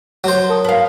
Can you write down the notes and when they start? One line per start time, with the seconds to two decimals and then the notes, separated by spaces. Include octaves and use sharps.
0.24 F#3 C5
0.49 A#4 A5 D#6
0.64 B4 F5